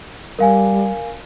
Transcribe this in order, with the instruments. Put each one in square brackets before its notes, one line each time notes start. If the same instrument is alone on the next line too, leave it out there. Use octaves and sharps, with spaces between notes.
[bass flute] G3 [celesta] A#4 F5 G#5